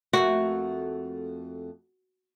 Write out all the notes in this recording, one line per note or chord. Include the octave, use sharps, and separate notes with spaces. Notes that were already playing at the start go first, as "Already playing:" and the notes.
F2 A3 A#3 F#4